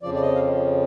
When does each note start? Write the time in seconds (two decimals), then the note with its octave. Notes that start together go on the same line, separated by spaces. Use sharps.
0.02 F2 C#3 F3 D5
0.14 D5
0.21 D#5
0.35 F5